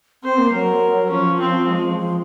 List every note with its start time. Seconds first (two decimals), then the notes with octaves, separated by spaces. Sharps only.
0.23 C4 C5
0.38 A#3
0.52 F#3 A#4
1.10 F3 C#4
1.40 C4
1.68 G#3
1.98 F3